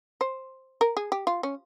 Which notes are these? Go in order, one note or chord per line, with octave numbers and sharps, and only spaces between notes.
C5
A#4
G#4
G4
F4
C#4